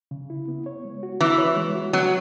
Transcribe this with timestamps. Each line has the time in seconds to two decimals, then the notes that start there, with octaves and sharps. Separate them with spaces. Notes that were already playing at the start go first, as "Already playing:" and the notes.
0.11 C#3
0.30 E4
0.48 B3
0.66 C#5
0.85 G#3
1.03 F#4
1.21 E3 B3
1.38 C#5
1.56 G#3
1.75 F#4
1.93 F#3 B3